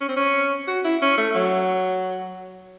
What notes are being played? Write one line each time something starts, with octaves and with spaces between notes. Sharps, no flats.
C#4
C4
C#4
F#4
E4
C#4
A3
F#3